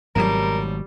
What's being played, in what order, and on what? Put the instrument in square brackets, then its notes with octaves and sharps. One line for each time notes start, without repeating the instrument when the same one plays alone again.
[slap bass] G#1 G#2 B2 [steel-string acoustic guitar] F#3 A5 [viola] G3 [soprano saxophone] A#4